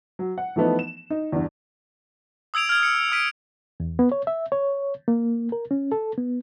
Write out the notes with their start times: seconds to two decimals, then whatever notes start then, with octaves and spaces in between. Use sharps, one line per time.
0.19 F#3
0.38 F#5
0.56 E3 F3 A3 B3 D#4
0.79 E7
1.10 D#4
1.32 E2 G2
2.54 D#6 E6 G#6 D7 F7
2.69 F6 G#6
2.83 C#7
3.12 E6 F6 B6 D7 D#7
3.80 E2
3.99 B3
4.12 C#5
4.27 E5
4.52 C#5
5.08 A#3
5.52 A#4
5.71 C#4
5.92 A4
6.18 B3